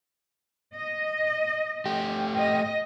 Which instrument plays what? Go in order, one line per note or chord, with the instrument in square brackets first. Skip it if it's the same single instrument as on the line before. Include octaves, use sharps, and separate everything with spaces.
[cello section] D#5
[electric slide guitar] A3 G4
[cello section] D#5